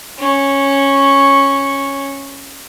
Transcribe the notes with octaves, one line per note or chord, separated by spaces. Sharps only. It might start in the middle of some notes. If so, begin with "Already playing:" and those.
C#4 C#6